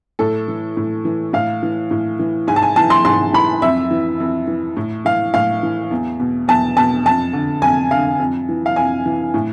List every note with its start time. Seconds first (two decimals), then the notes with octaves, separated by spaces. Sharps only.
0.19 A2 A4
0.48 E3
0.77 A2
1.05 E3
1.33 A2 F5
1.63 E3
1.91 A2
2.19 E3
2.47 G#2 G#5
2.56 A5
2.62 G#5
2.76 E3 A5
2.90 C6
3.05 G#2 C6
3.33 E3 B5
3.62 F2 E5
3.91 E3
4.20 F2
4.47 E3
4.77 A2
5.05 E3 F5
5.34 A2 F5
5.63 E3
5.91 E2
6.20 B2
6.48 E2 A5
6.77 B2 A5
7.05 F2 A5
7.33 D3
7.62 F2 G#5
7.91 D3 F5
8.19 F2
8.49 E3
8.66 F5
8.76 F2 G#5
9.06 E3
9.34 A2